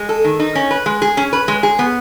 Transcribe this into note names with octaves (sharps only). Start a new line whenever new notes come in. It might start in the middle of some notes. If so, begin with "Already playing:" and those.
Already playing: G#3
A4
D#3
D#4
C#4
B4
G#3
G#4
C#4
B4
G#3
G#4
B3